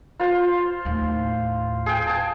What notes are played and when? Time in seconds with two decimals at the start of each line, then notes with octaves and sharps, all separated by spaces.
0.20 F4 C5
0.85 D#2 A2
1.86 G#4 G5
2.07 G#5 A5